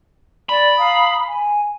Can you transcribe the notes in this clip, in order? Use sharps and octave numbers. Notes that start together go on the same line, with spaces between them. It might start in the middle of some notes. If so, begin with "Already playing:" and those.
D5 B5
F5 A#5 D#6
G#5